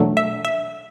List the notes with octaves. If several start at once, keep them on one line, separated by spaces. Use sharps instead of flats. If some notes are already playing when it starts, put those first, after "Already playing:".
Already playing: E2 B2 F#3 A3 D4
E5
E5